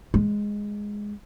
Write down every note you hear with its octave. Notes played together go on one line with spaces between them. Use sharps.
G#3